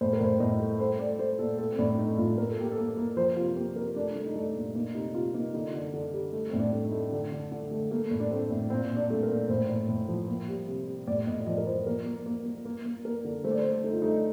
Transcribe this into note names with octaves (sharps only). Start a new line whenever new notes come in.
A2 C5
A#4
A2 C5
A2 D#5
A3
A3 C5
A3 D5
A3 C5
A#2 A4
A3 A4
C4
A2 D4
A3 D#4
A2 F4
A#3 A#4
A4
A#3 G4
A4
A#3
A#3
F3 C5
C3 F4
A#3 G4
C3 A#4
A3 D4
A3
D#4
A3 D4
A#2
A#3 D#4
C3 D#4
C3 F4
A#3 D#4
D3 D#4
D3
D3
G3
A3
A2 C4
D4
A3
D#4
A3
D3
D3
D3
A3
A3 A#3
A2
D4
A3 C4
A2
A#2 C4
A#2
D4
A3
A#4
A#2
A2 C5
A2
A2
F3
A#3
G3
C3
G3
A2 D5
A2 D#5
D#5
F3 D5
A#4
F3 C5
A#3 A#4
A#3
A#3
A#3
A#3
A#3
A#3 A#4
D3
A3 C5
D5
C5
D3
A3 D#4
F4
A3 D#4